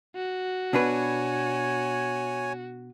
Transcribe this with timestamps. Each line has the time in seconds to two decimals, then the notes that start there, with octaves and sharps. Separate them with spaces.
0.16 F#4
0.73 B2 D4 B4 C#5 G#5